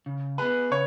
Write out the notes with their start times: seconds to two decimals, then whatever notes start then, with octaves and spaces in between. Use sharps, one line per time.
0.06 C#3
0.38 B3 G#4 B4
0.71 C#3 C#5